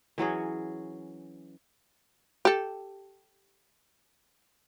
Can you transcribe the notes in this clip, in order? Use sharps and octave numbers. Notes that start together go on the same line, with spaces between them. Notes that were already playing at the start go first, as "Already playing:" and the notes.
E3 F#3 C#4 G#4
G4 A4